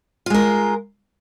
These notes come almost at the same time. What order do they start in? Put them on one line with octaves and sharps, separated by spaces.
F4 G#3 A#4